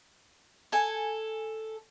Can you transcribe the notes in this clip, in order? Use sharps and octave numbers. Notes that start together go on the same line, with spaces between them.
A4 G#5